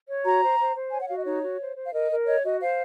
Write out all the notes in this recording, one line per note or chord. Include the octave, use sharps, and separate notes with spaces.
C#5
F#4 A#5
C5
C5
C5
C#5 G#5
F#5
F#4 F5
D#5
D#4 C#5
F#4
C5
C5
F5
A#4 D#5
A#4
C#5 D#5
F#4 D#5
C5 F5